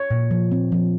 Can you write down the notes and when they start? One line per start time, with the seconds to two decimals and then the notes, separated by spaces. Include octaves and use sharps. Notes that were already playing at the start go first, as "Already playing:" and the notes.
Already playing: C#5
0.11 A#2
0.31 F3
0.52 C4
0.72 F3